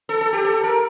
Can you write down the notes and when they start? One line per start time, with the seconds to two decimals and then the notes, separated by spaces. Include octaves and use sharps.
0.09 A4
0.21 A4
0.33 G4
0.45 A4
0.63 A#4